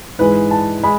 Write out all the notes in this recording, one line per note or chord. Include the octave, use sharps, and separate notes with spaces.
G#2 E3 G#3 B4
A5
G#3 B5